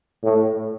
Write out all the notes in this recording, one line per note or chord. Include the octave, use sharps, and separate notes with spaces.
A2